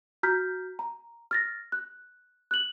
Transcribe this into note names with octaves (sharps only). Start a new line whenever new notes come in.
F#4 A#5 F6 G6 B6
A#5
F6 A6 A#6
F#6
F#6 F#7